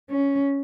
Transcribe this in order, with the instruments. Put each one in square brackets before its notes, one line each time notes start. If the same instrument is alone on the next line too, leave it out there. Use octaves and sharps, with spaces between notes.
[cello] C#4